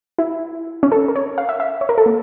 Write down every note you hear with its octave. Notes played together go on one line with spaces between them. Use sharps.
E4
C#4
A4
A#4
C#5
F5
E5
E5
C#5
A#4
A4
A#3